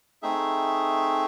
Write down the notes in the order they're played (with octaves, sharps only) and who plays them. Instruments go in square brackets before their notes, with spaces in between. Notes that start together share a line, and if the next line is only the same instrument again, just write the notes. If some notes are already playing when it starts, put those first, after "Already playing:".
[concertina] A3 C4 D#4 G#4 E5